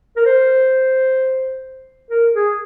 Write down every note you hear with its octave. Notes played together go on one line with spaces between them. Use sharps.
A#4
C5
A#4
G#4